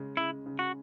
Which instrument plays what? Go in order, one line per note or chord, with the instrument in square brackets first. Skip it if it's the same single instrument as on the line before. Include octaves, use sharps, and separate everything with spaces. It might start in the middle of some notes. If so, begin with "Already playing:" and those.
Already playing: [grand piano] C#3 G#3
[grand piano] C#3 [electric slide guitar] E4
[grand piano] C#3
[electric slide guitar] F#4